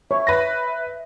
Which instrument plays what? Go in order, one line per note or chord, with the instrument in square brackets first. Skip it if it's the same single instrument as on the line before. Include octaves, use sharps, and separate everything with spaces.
[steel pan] C#5 [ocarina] E5
[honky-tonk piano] B4 A#6